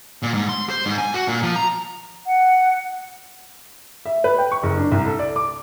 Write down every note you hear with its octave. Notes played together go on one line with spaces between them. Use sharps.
A#2
G#2
C6
C5
G#2
G#5
F#4
A#2
F3
A#5
F#5
E5
B4
G5
C#6
F#1
D4
C2
A4
D5
D6